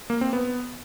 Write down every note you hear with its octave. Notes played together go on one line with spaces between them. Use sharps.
A#3
C4
B3